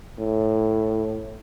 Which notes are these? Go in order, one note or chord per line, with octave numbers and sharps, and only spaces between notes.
A2